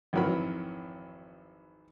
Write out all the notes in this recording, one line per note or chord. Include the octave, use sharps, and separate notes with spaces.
G#1 F2 E3 F#3 A#4 B5